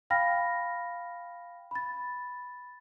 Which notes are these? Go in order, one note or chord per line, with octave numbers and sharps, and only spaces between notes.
F5 G5 B5 F6 A#6
B5 A6